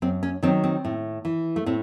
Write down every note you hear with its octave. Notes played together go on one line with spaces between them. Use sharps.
F#2 C4
C#4
D#3 F#3 C4
C4
A2
E3
A3
A2 C4